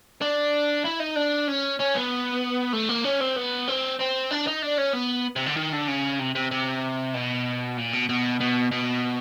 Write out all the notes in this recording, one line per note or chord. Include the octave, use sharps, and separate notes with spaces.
D4
E4
D#4
D4
C#4
C#4
B3
A3
A#3
C#4
C4
B3
C4
C4
D4
D#4
D4
C#4
B3
C3
D3
D#3
D3
C#3
C3
C3
C3
B2
A#2
B2
B2
B2
B2